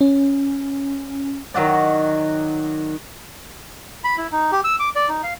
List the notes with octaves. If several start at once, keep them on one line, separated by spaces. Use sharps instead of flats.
C#4
D#3 F#3 F#4 D5
B5
E4
D#4
G4
E6
D6
D5
D#4
F5